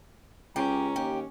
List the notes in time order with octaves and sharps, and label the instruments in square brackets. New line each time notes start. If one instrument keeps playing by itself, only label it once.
[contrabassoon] C#2 [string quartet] C#4 [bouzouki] G4 [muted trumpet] A#5
[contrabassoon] D#2 [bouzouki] G4